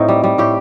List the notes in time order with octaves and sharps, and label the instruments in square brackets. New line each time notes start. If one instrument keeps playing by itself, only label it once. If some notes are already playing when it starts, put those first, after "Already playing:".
Already playing: [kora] A2 C4 D#4
G3
G3
A2 G4